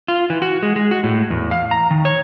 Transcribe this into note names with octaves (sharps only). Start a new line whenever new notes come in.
F4
E3
F#4
G#3
G#3
F#4
A2
E2
F5
A#5
D#3
C#5